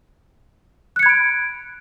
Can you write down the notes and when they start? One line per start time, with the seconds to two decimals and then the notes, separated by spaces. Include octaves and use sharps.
0.96 F#6
0.99 C#7
1.03 G#6
1.06 B5
1.09 D7